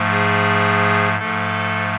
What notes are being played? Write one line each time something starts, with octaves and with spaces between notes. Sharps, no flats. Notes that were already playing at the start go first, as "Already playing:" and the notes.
Already playing: G#2 F3 A3
G#4
G#2 F3 A3 A4